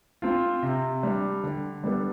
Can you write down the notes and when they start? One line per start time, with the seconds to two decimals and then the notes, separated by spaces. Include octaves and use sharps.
0.22 C4 F4
0.63 C3
1.03 G3 D4
1.44 D3
1.84 G3 B3 D4 A4